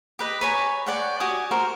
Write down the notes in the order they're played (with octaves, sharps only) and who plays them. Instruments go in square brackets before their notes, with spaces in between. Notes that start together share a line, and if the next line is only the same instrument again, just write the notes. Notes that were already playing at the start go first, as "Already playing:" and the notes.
[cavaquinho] G4 B4 D#5
B4 C#5 G#5 A#5
C#5 D5 F#5 G5
F#4 G4 G#5 D#6
F#4 A#4 C5